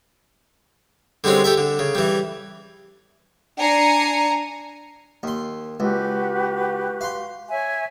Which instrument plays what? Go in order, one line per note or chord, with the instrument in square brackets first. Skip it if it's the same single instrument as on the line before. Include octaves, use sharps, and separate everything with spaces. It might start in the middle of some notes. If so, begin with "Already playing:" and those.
[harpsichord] D3 G3 G#3 C4 C#4
G4 A4 E5
D3
C#3
E3 G3
[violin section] D4 G#5 A#5 C7 C#7
[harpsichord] D#2 C6
[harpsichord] C#2 [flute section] F#4 G4 B4
[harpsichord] F5 C6
[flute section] C#5 E5 G#5